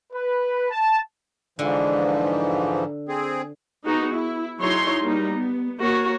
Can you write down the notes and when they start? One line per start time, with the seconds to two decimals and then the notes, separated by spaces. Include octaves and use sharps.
0.13 B4
0.70 A5
1.59 G#2 D3 E3 F3
3.09 C4 G#4
3.85 B3 D#4 F#4 G#4
4.14 E4
4.59 F#3 D#4 E4 G#4 C#5 C6
5.02 G3 A#3 D#4
5.34 B3
5.80 A#3 F#4 C#5